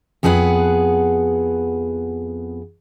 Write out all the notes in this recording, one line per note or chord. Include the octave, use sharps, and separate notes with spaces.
F2 B3 G#4 B4 F#5